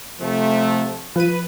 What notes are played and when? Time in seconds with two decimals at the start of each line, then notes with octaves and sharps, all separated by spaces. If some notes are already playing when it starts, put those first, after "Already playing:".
0.20 C3 F3 A3
1.16 F3 B4 D#7